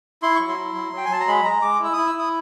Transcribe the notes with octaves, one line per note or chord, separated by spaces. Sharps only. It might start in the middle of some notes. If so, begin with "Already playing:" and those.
E4 C6
F#3 C#6
C6
E4
F#3
F#3 G5
G#5
F#3 A5
A#5
G#3 B5
G#3 A#5
G#3 D6
E4 E6
E4 D#6
E6
E4 D#6